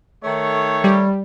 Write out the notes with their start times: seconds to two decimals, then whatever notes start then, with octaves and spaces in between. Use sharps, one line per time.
0.24 D#3 A3 C#5
0.84 G3